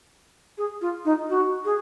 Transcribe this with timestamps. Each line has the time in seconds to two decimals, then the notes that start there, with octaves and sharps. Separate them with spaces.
0.58 G#4
0.81 F4
1.05 D#4
1.29 F#4
1.65 G#4